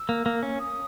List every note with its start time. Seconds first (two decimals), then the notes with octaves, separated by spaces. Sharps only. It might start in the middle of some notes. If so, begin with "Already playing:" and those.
Already playing: E6
0.09 A#3
0.26 A#3
0.43 C#4
0.59 D#6